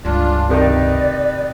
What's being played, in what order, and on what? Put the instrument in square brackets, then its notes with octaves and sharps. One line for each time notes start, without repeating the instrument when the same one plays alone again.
[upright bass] C#2 G2 [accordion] D4 F4
[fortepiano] C3 D#3 D#4 [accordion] B4 [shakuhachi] D5